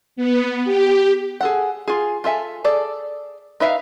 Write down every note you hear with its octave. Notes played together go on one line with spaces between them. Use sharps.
B3
G4
G#4 A4 F#5
F4 G#4
F4 A4 E5 G#5
G#4 A4 D5
D#4 B4 E5 F5